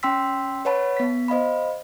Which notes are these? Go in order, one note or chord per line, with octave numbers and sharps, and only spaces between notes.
C#4 G5 C6 E6 B6
B4 C#5 F#5 A5 B5
B3 B6
C5 D#5 F5 B5